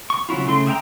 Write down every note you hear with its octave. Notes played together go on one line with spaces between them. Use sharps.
C#6
C#3 F#3 E4 F4
C#3 A3 C6
G#4 E5 F#5 G5 A#5